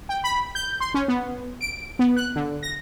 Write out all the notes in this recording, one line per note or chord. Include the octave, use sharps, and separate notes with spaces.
G5
B5
G6
C6
C#4
B3
D7
B3
F#6
D3
A#6